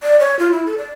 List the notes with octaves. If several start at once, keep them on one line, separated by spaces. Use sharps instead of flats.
D5
C#5
F4
E4
A4
D5